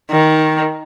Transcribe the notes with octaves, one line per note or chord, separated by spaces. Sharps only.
D#3